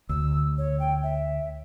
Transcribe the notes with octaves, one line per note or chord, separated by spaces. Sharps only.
D2 E6
C#5
G5
E5